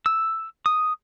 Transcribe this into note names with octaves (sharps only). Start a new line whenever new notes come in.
E6
D#6